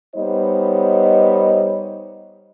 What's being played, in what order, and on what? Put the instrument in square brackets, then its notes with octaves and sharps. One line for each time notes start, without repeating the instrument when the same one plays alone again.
[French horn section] G3 B3 D#4 C5 C#5 D#5